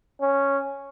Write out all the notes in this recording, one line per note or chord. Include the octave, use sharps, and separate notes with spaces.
C#4